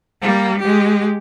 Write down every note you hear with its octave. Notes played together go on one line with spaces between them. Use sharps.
G3 A#3
G#3 G4